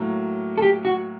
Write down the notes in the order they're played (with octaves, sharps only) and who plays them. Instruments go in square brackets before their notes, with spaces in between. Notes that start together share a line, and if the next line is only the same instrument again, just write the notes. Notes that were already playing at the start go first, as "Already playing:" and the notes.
Already playing: [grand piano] A2 F#3 A#3
[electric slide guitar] A4
G4
F#4